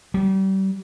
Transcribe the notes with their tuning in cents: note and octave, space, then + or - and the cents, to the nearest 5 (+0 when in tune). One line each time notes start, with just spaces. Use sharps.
G3 -35